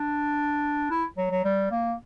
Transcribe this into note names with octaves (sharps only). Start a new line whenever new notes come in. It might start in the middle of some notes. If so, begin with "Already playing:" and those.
Already playing: D4
E4
F#3
F#3
G3
A#3